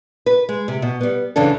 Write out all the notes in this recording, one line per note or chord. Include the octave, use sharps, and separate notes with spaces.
B4
G#3
C3
B2
G3 B3
F#2 C#3 E3 D4 A4